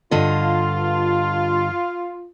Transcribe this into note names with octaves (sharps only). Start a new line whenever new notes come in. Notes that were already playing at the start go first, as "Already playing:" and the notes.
G2 D3 F4 D#5